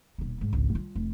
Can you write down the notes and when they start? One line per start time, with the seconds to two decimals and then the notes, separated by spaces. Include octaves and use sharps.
0.18 D#1 B2
0.41 G#2
0.53 G#1 C#2
0.75 G3 F4
0.95 F1